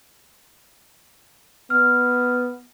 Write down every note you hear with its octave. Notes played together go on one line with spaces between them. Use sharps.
B3 F6